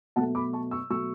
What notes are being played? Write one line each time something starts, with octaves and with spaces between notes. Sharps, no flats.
B2 F#3 A3 F#5 A5
B5 D6
A5 C#6
C#6 E6
B2 F#3 A3 C#6 E6